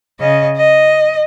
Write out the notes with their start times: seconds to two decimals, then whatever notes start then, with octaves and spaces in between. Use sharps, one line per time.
0.20 C#3 D#5
0.57 D#5